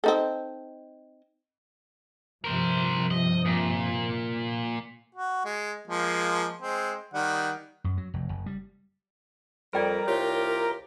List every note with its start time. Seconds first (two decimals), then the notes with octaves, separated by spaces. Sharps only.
0.04 C4 D#4 A4
2.44 G2 C3 F3 A#4 C5
3.11 D#5
3.45 A#2
5.15 F#4
5.45 G#3
5.88 F3 G#3 A#3
6.62 G#3 C4
7.14 D#3 G3 F#5
7.84 F#2
7.97 F#3
8.14 F1
8.29 F#1
8.46 G3
9.73 F2 G3 A#4 D5 G5 B5
10.07 C2 F4 G4 C5 C#5